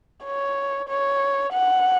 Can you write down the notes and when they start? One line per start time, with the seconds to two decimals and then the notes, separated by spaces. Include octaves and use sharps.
0.24 C#5
0.89 C#5
1.53 F#5